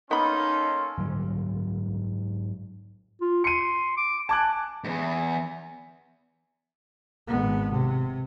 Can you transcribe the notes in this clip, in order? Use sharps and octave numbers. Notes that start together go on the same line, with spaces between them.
A#3 B3 C#4 D#4 A4 B5 C6
G#2 D3 F#3 G3
F4
C6 C#7 D#7
D6
G#5 A5 D6 F#6
E2 G#2
G#1 B3
C3